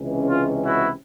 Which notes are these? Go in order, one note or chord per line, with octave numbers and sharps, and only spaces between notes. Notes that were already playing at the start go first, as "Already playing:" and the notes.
Already playing: C#2 C3 E3 G#3 C#4
F4
E4 F#4